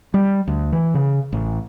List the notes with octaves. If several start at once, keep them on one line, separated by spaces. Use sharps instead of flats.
G3
D2
E3
C#3
A1